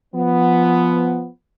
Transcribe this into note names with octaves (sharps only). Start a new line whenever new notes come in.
F3 B3